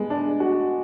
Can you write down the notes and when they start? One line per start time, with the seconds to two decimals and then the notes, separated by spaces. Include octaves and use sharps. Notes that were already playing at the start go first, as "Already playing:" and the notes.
Already playing: G#3 B3
0.10 D4
0.40 F#4